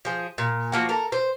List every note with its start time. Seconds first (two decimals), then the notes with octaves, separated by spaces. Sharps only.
0.05 F3 G#4
0.38 A#2
0.72 F3 A#3 F#4
0.89 A4 A#4
1.12 C5